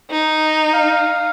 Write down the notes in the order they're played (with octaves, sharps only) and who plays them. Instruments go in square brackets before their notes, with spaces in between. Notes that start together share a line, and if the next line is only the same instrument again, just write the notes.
[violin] D#4
[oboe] F5